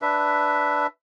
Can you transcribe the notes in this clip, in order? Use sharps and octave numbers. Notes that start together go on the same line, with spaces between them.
D4 B4 E5